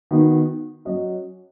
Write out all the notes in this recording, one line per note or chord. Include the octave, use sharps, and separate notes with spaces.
D#3 B3 D#4 F#4
F#3 C#4 F#4 D#5